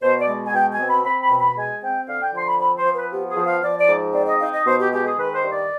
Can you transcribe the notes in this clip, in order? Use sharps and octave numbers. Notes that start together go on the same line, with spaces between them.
B2 C5
D5
G#3
G#5
B2 G5
G#5
C4
B5
C4 B5
B5
B2
B5
G#3 G#5
C4 G5
D3 F5
G5
F3 C6
B5
C4 B5
C5
F3
B4
B3 G4
G#4
F3
F5
F3 D5
D5
G#2
C4 D5
D#5
D#4 F5
D#5
B2 C5
G4
G#3 G4
G#4
D#3 B4
C5
G2
D5